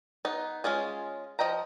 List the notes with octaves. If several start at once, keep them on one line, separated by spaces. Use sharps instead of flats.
B3 D#4
G#3 C#4 F4 G#4
F3 D#5 G5 A#5